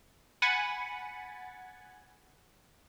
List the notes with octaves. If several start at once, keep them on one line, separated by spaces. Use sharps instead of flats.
F#5 G#5 B5 A6 C#7